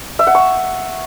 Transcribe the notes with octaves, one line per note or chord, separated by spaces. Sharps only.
E5
F#5
C#6